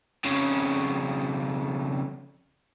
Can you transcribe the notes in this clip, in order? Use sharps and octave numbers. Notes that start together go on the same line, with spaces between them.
F2 C#3